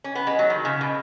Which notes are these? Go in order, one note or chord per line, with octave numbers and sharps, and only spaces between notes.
C#4
B3
G#3
F#3
D#3
C#3
B2